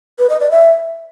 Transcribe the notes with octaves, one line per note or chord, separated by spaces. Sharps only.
B4
D#5
D5
E5